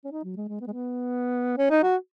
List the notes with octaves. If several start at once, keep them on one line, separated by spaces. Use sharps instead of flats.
C#4
D#4
F#3
G#3
G#3
B3
G#3
B3
C#4
D#4
F#4